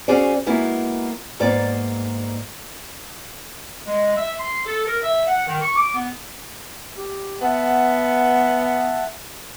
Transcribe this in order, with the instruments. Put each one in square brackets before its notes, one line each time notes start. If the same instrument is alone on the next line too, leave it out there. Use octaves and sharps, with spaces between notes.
[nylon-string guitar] C#4 F#4 G#4 C5 D5
G#3 A#3 B3 E4 F#4
G#2 A#3 B3 D5
[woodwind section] G#3
E5
C6
A4
A#4
E5
F#5
D#3
C#6
D6
B3
[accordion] G4
[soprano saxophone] B3 [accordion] E5 F#5 A5